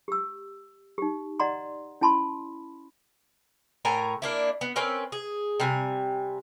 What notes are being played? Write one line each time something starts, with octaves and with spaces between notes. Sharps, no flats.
G4 E6
D#4 G4
D5 D#5 F#5 A#5 C6
C#4 E4 A5 B5 C6
A2 A#4 G#5 A#5
A#3 D4 E4
B3
C4 C#4 A#4 B4
G#4
C3 G3 G#5